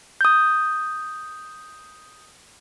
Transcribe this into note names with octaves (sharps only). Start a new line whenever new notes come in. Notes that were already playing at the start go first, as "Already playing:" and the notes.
D#6 G6